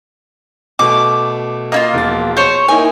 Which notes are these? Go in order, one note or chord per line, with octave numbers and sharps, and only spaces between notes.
B2 A3 D6
A#3 E4 F4 D#5
E1 F3 A6
C5 C#5
A#3 D#4 E4 G#5